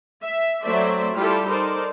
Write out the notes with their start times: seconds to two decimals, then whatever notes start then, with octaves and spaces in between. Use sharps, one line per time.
0.22 E5
0.62 F#3 A3 C4 C5 D5 E5
1.14 G3 E4 F4 G4 A4
1.47 D#4 A4 A#4 C5 D5